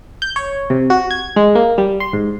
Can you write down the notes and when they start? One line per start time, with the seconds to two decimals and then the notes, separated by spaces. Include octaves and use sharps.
0.22 G6
0.36 C#5
0.70 C3
0.90 F#4
1.11 G#6
1.36 G#3
1.55 A#3
1.78 G3
2.00 C6
2.13 G#2